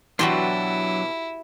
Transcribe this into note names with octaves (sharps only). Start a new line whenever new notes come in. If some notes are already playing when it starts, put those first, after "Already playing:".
B2 E3 F#3 D4 E4 F#4 G4 C6